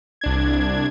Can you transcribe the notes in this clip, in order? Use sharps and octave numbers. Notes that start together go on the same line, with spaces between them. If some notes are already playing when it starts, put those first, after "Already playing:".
C2 D4 G#6